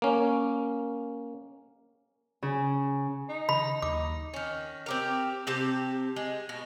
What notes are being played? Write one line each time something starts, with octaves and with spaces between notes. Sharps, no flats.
A#3 C#4
C#3
D#4
C#3 B5
D#2 D#4 D6
D#3 C#4
C4 G4 A#4
C3 C4 G4 A5
G#3
B2